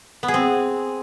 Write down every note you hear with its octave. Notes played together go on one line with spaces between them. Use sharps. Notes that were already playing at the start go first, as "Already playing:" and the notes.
B3
G#4
C4